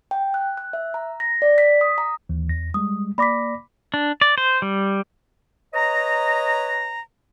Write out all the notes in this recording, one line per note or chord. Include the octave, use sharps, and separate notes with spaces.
G5
F#6
F#6
E5
A#5
A#6
D5
B6
D#6
A#5
D#2 E3
E2 A#6
G3 G#3 D#6
A#3 D5 B5 D6 A#6 B6
D4
D5
C5
G3
B4 C#5 D#5 A#5